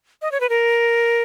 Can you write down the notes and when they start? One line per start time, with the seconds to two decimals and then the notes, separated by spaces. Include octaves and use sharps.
0.22 D#5
0.32 C#5
0.40 B4
0.49 A#4